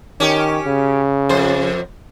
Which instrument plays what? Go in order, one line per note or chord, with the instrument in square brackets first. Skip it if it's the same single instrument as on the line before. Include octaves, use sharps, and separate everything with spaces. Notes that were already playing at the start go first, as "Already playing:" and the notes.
[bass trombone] D#3 [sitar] C#4 G4
[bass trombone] C#3
[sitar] F2 C5